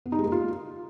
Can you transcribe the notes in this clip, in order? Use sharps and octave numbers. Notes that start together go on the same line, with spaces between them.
B3
D#4
G#3
A#3
F4